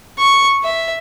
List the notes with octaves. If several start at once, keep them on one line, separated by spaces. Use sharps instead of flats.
C#6
E5